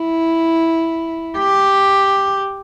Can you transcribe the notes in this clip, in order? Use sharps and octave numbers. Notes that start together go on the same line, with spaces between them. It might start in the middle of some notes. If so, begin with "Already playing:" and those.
Already playing: E4
G4